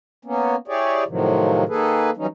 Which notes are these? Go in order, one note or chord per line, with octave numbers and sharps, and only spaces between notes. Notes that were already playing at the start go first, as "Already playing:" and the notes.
A#3 B3 C#4
E4 G4 G#4 C#5 D5
A2 C3 D#3 F3 F#3
D#3 A#3 G#4 A4 B4
E3 F#3 G3 C#4 D#4